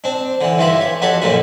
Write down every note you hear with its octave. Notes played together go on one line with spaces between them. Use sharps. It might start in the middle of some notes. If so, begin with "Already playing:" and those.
C4 D4
D3 E3
G2 E3 F4 G4 E5 B5
C#5
F2 F#4 G4 C#5 A5 B5
A#1 F#2 A#2 D3 F#4